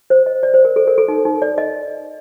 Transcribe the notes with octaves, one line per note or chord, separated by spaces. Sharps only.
C5
D#5
D5
C5
A#4
A4
A#4
A4
D#4
D#4
D5
D#5